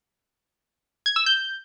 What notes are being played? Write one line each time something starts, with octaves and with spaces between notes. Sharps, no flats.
G#6
E6
G6